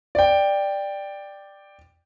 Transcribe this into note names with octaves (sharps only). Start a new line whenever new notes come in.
D5 G5